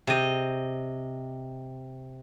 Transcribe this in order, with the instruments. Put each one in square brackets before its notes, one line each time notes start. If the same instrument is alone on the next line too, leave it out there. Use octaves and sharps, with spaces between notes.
[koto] C3 D#5